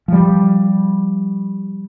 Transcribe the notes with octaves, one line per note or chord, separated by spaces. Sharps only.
F3 G3